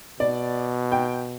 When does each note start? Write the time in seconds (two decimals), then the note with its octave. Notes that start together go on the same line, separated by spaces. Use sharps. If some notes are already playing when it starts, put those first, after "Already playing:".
0.20 B2 D5
0.92 G5